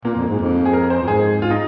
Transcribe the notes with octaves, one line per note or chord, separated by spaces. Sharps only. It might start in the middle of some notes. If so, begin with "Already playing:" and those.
A#2 A#3
F2
G#2
F2
G#4
A#4
C5
F2
G#2 G#4
G#2 F4
D#4